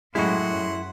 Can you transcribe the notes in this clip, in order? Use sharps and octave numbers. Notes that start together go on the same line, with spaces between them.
F#2 A2 G#3 E4 F#4 F#5 C6